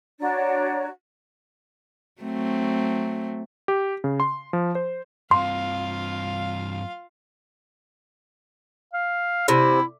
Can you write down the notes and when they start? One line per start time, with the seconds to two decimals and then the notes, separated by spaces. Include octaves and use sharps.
0.20 D4 F#4 C#5 A#5
2.22 F#3 A3 C4
3.68 G4
4.04 C#3
4.20 C6
4.53 F3
4.75 C5
5.31 G2 C4 F4 F5 C6
8.93 F5
9.48 C3 E4